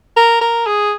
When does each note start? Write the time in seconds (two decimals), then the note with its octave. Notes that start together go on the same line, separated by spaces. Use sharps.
0.16 A#4
0.41 A#4
0.66 G#4